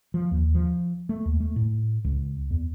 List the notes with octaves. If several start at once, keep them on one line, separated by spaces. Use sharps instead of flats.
F3
D#2
F3
A3
D#2
A3
A2
C#2
E2